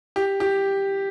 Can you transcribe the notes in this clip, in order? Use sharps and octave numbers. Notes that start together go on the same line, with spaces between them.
G4
G4